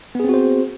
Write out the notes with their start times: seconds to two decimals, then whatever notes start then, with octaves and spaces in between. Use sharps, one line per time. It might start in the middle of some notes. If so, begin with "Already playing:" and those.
0.15 B3
0.20 G#4
0.24 C4
0.29 F#4
0.34 C5